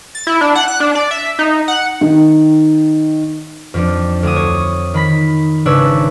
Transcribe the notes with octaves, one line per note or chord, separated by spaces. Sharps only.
A6
E4
D4
F#5
F#6
D4
D5
E5
D#4
F#5
D#3
F2 F3 D4
D2 D4 D#6
C#5
D#3 B5 B6
G#1 C#3 D4 B4 C#5 E6